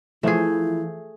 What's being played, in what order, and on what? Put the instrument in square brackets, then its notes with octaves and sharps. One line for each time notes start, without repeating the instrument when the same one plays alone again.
[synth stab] E3 F3 [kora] A3 G#4 [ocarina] E4